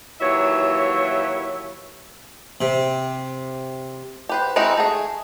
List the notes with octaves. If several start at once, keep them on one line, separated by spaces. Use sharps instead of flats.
D#2 E3 F#3 C#5 E5
C3
G4 B4 C5
G#3 C4 D#4 E4 F#4
A3 G#4